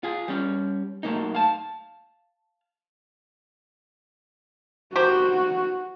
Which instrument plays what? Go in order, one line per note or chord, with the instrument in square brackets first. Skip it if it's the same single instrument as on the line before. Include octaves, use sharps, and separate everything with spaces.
[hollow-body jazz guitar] F4 G#4
G3 C#4
B1 A3 A#3 D#4
F5 A5
[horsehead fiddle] F#4 [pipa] G4 A#4 C5